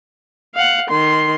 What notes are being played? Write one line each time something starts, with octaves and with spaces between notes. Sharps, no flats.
F5 F#5
D#3 C6